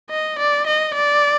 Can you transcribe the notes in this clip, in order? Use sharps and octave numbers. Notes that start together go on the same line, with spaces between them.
D#5
D5
D#5
D5